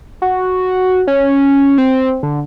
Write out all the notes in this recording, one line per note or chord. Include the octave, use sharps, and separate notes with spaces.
F#4
C#4
C4
D3